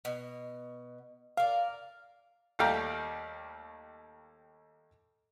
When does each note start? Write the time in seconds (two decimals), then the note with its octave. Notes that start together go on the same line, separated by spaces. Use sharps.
0.05 B2
1.37 A#4 D5 F5
2.59 D#2 G3 A3 F5 G5 A#5